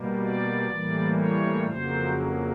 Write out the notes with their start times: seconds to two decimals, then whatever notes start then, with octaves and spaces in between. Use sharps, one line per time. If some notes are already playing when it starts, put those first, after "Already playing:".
Already playing: B2 G3 A#3
0.19 D5
0.68 A2 E3 G3 A#3
1.16 C#5
1.65 F2 C#3 F#3 A#3 C5